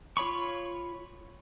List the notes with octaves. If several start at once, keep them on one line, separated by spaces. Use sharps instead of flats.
F4 C#5 B5 C#6